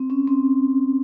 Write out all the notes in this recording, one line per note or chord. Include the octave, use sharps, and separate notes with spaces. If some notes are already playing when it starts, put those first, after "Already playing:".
Already playing: C4
C#4
C4